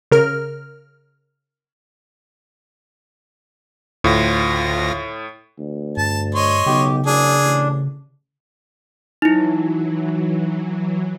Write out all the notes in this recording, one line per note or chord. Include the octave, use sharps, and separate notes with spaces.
C#3 A#4 F6
D2 A2 F4 A#6
D2
G2 A5
C#5 D#5 C6
B1 C#3 G4
F#1 D4 G#4
A1
E3 F#3 D#4 E4